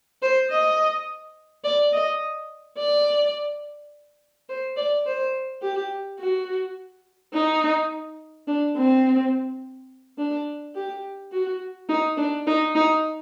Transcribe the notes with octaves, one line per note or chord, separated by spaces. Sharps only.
C5
D#5
D5
D#5
D5
C5
D5
C5
G4
F#4
D#4
D4
C4
D4
G4
F#4
D#4
D4
D#4
D#4